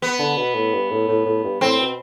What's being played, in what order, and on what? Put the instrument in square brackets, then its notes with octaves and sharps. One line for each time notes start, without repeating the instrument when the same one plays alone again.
[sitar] B3
[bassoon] D3
B2
A2
G2
A2
A2
A2
G2
[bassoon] A2 [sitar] C4
[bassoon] B2